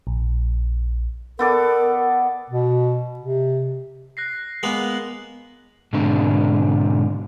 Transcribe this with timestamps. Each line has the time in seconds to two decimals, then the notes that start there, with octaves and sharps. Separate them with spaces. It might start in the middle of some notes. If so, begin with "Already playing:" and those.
0.07 A#1
1.39 B3 A4 A#4 D5
2.50 B2
3.19 C3
4.17 F#6 A#6 C7
4.63 G#3 A#3 B3 F#7
5.93 G#2 B2 D3 C4 D4